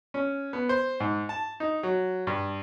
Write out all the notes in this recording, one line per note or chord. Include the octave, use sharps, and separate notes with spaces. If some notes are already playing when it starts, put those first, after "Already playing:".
C#4
B3
C5
G#2
A5
D#4
F#3
G2